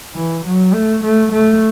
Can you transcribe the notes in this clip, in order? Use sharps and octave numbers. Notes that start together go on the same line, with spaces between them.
E3
F#3
A3
A3
A3